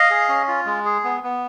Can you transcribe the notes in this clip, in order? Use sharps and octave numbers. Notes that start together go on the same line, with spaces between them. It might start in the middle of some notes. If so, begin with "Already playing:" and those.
Already playing: D#5 F5
G#4
C#4
F4
G#3
G#4
B3
B3